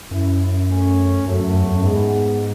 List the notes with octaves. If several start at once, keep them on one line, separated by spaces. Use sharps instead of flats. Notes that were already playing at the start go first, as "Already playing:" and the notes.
F#2 C#4 E4
A3 C#4
F#2 F#3 A3
F#2
F#2
E2
F#2
G#2 G#3 B3